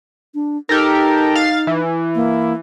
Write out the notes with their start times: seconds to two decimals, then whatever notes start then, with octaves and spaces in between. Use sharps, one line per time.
0.34 D4
0.69 D#4 G4 A4 A#4
1.35 F5 A6
1.67 E3
2.15 A#3